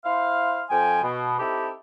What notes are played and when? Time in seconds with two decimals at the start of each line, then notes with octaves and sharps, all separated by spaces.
0.05 E4 C5 F5
0.70 F2 F3 G5 G#5
1.03 B2
1.39 C4 D#4 E4 G4 A4